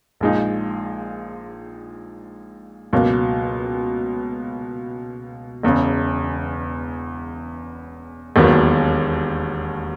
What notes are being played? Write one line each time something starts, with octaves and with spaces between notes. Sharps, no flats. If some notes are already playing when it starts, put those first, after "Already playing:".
A#1 A#2 G#3 D#4
C#2 B2 F#3 A#3
E1 E2 C#3
E1 D#2 D#3 F#3 B3